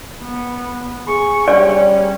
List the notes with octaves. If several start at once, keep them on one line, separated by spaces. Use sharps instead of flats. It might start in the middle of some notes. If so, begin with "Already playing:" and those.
B3
G#4 C#6
G3 C#4 D5